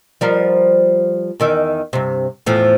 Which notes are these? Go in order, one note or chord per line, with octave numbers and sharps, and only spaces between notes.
F3 G3 A#4
E2 D#3 E5
G2 C3
E2 A2 F3